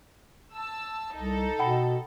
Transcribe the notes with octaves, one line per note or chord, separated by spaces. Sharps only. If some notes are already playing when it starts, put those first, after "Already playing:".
A5 E6
C2 D#4 A4
B2 F#5 G5 B5